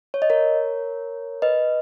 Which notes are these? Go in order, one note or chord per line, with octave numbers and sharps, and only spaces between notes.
C#5
D#5
A#4 C#5
B4 D#5